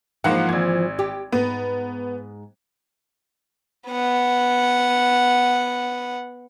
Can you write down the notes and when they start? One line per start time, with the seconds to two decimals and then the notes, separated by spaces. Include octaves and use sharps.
0.24 G#2 E3 F3 A#3 F#5
0.49 G#1 G#6
0.99 G4
1.32 G#2 B3
3.89 B3 F#5